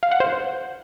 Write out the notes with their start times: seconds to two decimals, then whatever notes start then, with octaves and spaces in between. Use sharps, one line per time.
0.03 F5
0.11 F#5
0.20 C5